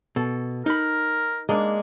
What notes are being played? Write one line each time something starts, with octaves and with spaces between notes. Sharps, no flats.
B2 A4
D#4 A#4 B5
G#3 A#3 D4